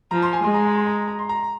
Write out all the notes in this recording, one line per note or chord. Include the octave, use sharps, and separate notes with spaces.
F3 A#5
C6
G#5
G#3 C6
A#5
G#5
C6
A#5
A#5
C6
A#5